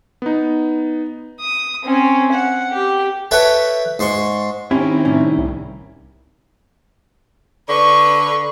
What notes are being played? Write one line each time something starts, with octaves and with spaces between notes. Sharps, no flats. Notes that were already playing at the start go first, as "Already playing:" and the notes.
B3 D#4
D#6
C4 C#4
F#5
G4
A4 B4 C#5 E5 G5
G#2 C6 C#6
D#3 C4 C#4 E4 G4
A2 C3 G3 C#4
C2
D3 B4 C#6